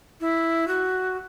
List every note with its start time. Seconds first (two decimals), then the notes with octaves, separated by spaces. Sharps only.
0.21 E4
0.68 F#4